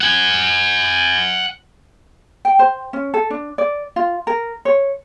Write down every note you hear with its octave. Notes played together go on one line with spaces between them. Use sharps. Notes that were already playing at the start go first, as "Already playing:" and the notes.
F#5 G#5
G5
C5
C#4
A4
D4
D5
F4
A#4
C#5